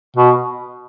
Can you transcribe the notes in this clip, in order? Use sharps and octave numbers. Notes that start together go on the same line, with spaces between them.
B2